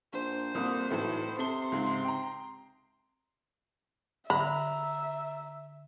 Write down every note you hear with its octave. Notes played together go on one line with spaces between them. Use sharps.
A#1 C5
C2 F2 A#3 D#6
B1 A2 E3 A3
C3 A4 C6 G7
C#2 G#2
G5 A#5
D3 E5 A#5 B5